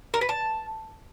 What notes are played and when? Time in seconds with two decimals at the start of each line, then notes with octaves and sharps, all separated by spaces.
0.14 A#4
0.21 B4
0.29 A5